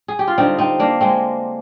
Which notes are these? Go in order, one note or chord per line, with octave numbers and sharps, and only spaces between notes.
G#4
G4
F4
D3 G3 C4 D#4
C4 D#4
A#3 D4
G#3 C4